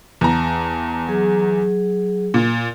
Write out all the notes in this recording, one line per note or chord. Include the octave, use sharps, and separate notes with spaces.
E2 A5 A#5
F#3 G#4
A#2